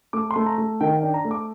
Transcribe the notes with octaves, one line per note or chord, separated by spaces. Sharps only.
A3 D6
C6
A3
A#5
A3
D#3 G5
G5
D4
A#5
A3
D6